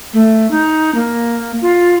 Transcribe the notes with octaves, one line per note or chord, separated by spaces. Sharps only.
A3
D#4
A#3
F4